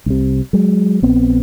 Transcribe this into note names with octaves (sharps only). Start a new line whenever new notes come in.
C2 C3
F#3 G#3
A#1 B3 C4